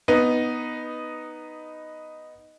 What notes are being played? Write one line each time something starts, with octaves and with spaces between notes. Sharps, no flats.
B3 D#4